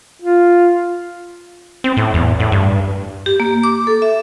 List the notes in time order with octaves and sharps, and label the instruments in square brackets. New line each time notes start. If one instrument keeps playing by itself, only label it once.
[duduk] F4
[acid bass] C4
A2
E2
A2
G2
[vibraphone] G4
A#3
D6
A4
E5